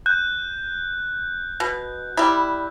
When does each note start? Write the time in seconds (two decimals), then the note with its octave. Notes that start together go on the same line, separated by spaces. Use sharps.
0.06 F#6 G6
1.60 B2
2.17 G3 E4